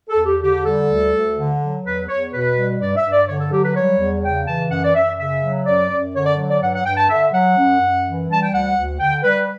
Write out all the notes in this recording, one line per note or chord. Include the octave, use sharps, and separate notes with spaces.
A4
E2
G4
D3 G4
G3 A4
D2
D2
D3
F#3
E2 B4
E2 C#5
B2 B4
G3
G2 D5
E5
G2
D5
D3 C#5
A4
F#3 G4
B4
G3 C#5
E2
C#3 G5
E3 A5
F#2 F#5
D5
F#2 E5
C#3 E5
F#3
F#2 D5
F#2
D3 C#5
D5
F#3
D5
G2 F#5
F#5
G2 G5
A5
D3 E5
F#3 F#5
F#2
F#2
E3
G3 A5
G5
D2 F#5
D2
D3 G5
G3 B4